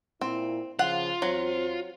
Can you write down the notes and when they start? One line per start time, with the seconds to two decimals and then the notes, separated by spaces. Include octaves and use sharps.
0.21 A#2 C4 E4
0.79 C#3 F3 F4 F#5
1.22 E2 F#3 C4 C5